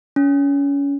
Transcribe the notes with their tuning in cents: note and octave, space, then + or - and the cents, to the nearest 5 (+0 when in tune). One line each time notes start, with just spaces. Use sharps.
C#4 +25